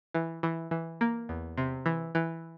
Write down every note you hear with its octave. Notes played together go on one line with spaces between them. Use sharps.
E3
E3
E3
A#3
E2
C3
E3
E3